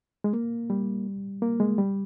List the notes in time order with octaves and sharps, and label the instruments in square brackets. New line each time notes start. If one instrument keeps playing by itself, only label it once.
[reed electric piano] G#3
A#3
G3
A#3
G#3
G3